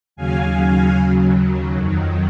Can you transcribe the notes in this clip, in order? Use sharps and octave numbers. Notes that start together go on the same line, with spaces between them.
D#2 C#3 F#3 F5 G#5
D#2 C#3 F#3
F2 D#3 F#3